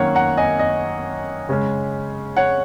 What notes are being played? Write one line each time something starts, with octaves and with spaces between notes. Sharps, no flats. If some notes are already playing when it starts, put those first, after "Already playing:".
Already playing: F#2 D#3 A#3 C#4 C#5 F#5
F#5 A#5
D#5 G#5
D#5
C#3 G#3 C#4
C#5 F#5